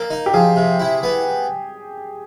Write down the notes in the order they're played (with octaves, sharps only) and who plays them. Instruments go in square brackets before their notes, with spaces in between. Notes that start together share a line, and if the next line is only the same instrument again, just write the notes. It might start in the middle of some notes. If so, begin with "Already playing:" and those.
Already playing: [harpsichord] A#3
D#4
[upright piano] G4
[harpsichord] F3 [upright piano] G#4
[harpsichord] C3
E4
B3